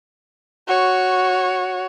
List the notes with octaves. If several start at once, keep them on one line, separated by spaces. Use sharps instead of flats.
F#4 C#5